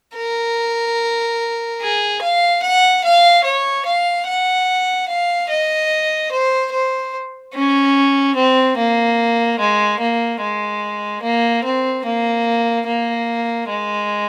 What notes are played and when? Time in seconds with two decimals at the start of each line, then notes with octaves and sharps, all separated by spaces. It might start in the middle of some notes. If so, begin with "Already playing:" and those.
0.16 A#4
1.81 G#4
2.22 F5
2.62 F#5
3.04 F5
3.44 C#5
3.86 F5
4.27 F#5
5.09 F5
5.49 D#5
6.31 C5
6.72 C5
7.54 C#4
8.35 C4
8.77 A#3
9.59 G#3
9.99 A#3
10.41 G#3
11.22 A#3
11.64 C4
12.05 A#3
12.86 A#3
13.68 G#3